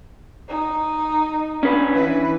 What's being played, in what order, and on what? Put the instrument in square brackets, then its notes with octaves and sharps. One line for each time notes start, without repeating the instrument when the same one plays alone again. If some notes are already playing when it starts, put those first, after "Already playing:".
[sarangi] D#4
[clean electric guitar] C#4 D4 B4
[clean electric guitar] E3 [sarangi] B4